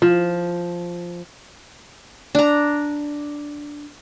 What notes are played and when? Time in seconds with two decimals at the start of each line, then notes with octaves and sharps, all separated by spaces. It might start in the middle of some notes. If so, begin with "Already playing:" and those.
0.02 F3
2.35 D4 A#5